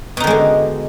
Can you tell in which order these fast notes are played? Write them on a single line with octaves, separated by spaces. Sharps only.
B2 D#4 D#3 G#3 D3